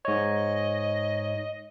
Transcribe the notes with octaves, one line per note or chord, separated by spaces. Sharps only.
G#2 C#5 D#5